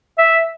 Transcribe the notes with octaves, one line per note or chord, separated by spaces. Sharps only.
E5